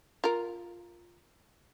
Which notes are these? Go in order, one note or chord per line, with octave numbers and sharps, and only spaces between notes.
F4 A#4